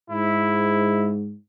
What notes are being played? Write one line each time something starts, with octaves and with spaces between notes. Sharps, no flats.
G#2 E4